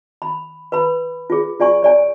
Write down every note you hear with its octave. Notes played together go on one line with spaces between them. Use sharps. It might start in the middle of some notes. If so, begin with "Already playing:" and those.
B5
B4 B5
F4 G#4
F4 D5 G#5 C#6
C#5 D5 G#5